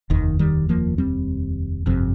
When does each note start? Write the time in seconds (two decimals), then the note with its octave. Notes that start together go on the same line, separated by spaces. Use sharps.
0.10 F1 D#2 D#3
0.39 D#3 G3
0.69 F3 A#3
0.98 G3 C4
1.86 G1 F2 C3